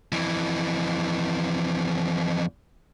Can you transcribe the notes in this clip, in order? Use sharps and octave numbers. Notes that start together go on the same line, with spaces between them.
F2 E3